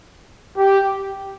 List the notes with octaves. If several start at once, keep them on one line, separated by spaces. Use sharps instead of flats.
G4